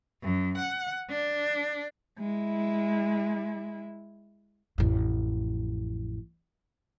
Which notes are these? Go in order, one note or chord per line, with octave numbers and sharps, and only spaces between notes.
F#2
F#5
D4
G#3 E4
A1 F2